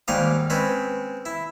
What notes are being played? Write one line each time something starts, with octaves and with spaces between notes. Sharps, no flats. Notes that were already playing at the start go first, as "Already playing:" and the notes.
D#2 G#2 G3 A#3 F5 D#6
G#3 C4 C#4 B4
E4